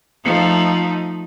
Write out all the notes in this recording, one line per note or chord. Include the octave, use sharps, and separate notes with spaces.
F3 A3 D#4